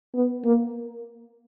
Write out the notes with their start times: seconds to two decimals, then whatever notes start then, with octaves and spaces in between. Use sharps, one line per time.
0.15 B3
0.45 A#3